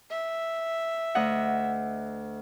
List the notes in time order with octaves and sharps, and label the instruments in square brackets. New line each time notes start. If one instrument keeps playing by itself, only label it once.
[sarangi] E5
[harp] D2 D#5 F#5